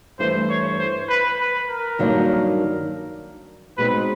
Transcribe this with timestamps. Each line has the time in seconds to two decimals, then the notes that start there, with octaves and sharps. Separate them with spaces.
0.19 G2 E3 A3 C5
0.49 C#5
0.79 C5
1.09 B4
1.39 B4
1.68 A#4
1.99 G2 D#3 F#3 A#3 D4
3.78 B2 G#3 C4 D#4 B4